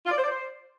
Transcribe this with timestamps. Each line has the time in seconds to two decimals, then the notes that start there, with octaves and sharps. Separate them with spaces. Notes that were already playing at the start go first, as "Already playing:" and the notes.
0.06 F4
0.11 D5
0.17 C5
0.22 D5
0.28 C5